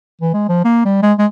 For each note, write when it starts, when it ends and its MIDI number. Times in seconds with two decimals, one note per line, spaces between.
0.21 0.33 52
0.34 0.48 56
0.49 0.60 53
0.64 0.85 58
0.85 1.01 55
1.02 1.13 56
1.18 1.26 56